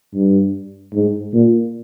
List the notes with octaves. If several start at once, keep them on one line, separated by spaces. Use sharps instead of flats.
G2
G#2
A#2